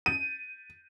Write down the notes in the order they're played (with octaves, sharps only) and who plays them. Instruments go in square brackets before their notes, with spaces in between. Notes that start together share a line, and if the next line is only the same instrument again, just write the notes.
[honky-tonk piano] D#7